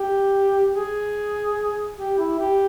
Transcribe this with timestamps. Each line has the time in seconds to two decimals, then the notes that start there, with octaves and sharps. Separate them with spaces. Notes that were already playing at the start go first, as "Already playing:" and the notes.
Already playing: G4
0.73 G#4
1.98 G4
2.18 E4
2.39 G4